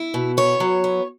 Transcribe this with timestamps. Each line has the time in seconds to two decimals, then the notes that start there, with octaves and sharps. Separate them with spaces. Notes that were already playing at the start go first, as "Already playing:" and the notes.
Already playing: E4
0.14 B2
0.37 B3 C#5
0.60 F#3
0.84 B3